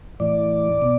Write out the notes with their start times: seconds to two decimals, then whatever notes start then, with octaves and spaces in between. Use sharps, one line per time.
0.20 A2 E3 D5
0.82 B2